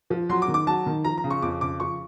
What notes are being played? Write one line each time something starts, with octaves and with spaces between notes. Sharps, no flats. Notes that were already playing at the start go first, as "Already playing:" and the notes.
F3
F#3 C6
D6
D#3
D6
F#3 A5
D#3
F3 A#5
A#5
C#3
C#6
F2 D6
C#3 D6
F3 C#6